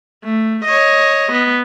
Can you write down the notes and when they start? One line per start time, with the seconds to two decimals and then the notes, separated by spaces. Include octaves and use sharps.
0.25 A3
0.65 C#5 D#5
1.32 B3